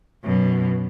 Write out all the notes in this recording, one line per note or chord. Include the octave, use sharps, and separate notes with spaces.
F#2 B2